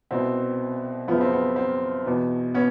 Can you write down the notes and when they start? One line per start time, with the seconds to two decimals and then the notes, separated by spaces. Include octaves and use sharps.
0.11 C2 B2 C4
1.08 F#2 C#3 F3 B3
1.21 C4
1.33 B3
1.56 C4
2.06 E2 B2
2.54 B3 C#4